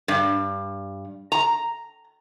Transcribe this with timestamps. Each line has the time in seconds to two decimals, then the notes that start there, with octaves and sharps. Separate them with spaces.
0.08 G2
1.32 A#5